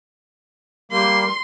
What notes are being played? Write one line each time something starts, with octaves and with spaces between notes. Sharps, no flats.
G3 A#3 C6